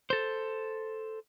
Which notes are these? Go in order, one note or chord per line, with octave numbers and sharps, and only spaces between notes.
A4 C5